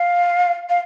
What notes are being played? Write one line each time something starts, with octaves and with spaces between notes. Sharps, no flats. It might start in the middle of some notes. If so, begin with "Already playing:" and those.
Already playing: F5
F5